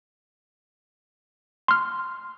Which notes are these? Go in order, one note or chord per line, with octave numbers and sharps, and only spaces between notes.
C6 F6